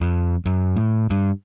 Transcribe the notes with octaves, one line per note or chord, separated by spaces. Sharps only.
F2
F#2
A2
G2